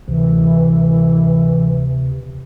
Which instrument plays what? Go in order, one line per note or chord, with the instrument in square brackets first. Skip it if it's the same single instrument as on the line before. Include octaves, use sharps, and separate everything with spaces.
[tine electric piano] D2 [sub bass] C3 [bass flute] E3